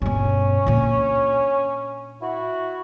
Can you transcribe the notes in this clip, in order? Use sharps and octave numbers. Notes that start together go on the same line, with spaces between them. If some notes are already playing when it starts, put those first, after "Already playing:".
G2 B2 C#4
A#2 D4
E4 F#4